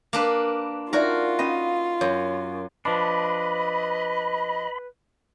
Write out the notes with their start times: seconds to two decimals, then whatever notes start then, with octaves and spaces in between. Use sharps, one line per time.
0.13 A#3 D4 B4
0.93 D#4 F4 F#4 A#4 D5 E5
1.39 C#4 D#5 F5 B5
2.01 F#2 C#5
2.85 F3 D4 B4 D#5 B5